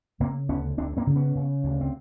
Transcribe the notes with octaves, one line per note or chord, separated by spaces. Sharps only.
C#3 A#3 C4
D2 B3 C#4
D2 C4 D4
A#3 C4
C#3
B3 C#4
C#3
D2
C4